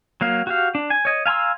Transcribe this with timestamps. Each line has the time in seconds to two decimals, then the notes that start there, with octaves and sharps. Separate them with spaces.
0.21 F#3 A#3 F5
0.47 F#4 G4 F5
0.75 D4
0.90 G#5
1.05 C#5 D#5
1.26 F5 G#5 A#5 C6 E6